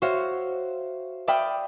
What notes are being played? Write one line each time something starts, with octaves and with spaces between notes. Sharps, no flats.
F#4 C5 C#5 E5 F5
D5 E5 F5 G5 B5 D#6